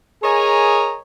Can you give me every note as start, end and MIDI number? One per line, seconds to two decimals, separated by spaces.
0.23 0.97 68
0.23 0.97 70
0.23 0.97 73
0.23 0.97 75
0.23 0.97 80
0.23 0.97 82